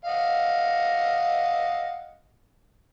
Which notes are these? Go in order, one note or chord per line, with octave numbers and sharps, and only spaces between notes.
D#5 F5 F#5